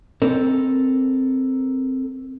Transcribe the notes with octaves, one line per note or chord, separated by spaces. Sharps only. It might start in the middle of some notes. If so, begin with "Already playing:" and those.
C4 A4 A#4